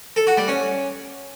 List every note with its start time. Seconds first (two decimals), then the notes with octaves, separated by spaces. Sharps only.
0.16 A4
0.27 F#4
0.37 G3
0.48 C#4